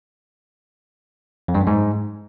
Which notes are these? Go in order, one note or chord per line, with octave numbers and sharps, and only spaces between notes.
F2
G2
F#2
G#2